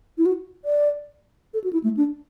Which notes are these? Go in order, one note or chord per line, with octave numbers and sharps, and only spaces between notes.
E4
F#4
D5
A4
F#4
E4
A3
D4